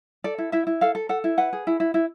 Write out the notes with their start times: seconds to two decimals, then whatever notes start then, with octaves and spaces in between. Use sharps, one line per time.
0.24 A4 D5
0.38 E4
0.52 E4 E5
0.67 E4
0.81 A4 F5
0.95 A4
1.09 A4 F#5
1.24 E4
1.38 B4 F#5
1.53 G#4
1.67 E4
1.80 E4
1.94 E4